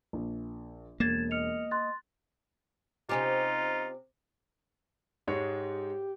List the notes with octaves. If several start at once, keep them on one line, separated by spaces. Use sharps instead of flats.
A#1
E1 A#3 G#6 A6 E7
D#5 F6 C#7 F7
C6 F#6 A6
C3 C#4 D#4 F4 G4
G#2 G#3 G4 C#5